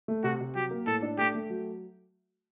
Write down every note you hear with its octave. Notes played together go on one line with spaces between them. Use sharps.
A3
C3 F#4
C3
F#3 G4
A#3
A2 A4
D4
A3 G4
A3
F#3